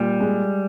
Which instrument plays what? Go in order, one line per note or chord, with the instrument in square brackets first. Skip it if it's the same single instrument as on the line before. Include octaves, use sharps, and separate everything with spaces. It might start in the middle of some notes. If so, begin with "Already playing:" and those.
Already playing: [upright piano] A#2 [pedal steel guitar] G3
[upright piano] G#3